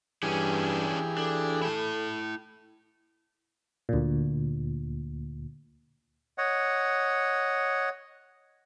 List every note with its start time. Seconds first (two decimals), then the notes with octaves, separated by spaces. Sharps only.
0.23 G2 E3 C#4 D4 G4 G#4
1.18 D4 A4
1.62 E4 A5
3.89 D2 A#2
6.38 C#5 D#5 F#5